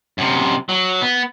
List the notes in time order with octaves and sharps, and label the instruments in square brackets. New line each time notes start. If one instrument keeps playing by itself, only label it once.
[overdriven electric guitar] F#2 C3
F#3
B3